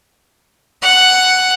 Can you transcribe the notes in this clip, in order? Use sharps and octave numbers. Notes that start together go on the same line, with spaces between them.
F#5